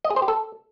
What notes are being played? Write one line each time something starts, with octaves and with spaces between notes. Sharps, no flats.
D#5
G#4
C5
G4
A4